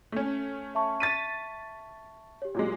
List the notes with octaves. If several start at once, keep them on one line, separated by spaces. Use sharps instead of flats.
A3 C#4
E5 A5 C#6
A6 B6 D#7
G4 C#5
A#2 F#3 G#3